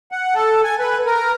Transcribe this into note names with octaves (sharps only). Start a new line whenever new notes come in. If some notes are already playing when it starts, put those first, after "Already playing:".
F#5
A4
G#5
B4
A#4